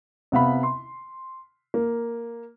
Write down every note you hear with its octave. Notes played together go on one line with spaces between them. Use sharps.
C3 B3 F5 B5
C6
A#3